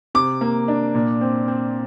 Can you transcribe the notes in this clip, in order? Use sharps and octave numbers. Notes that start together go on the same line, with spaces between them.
C3 D6
A#3
D4
A#2
C4
C4